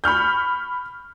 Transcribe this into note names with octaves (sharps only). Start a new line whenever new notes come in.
B5 C#6 F6 G6